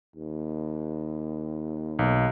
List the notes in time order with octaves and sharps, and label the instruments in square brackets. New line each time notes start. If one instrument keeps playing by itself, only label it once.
[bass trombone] D#2
[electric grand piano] B1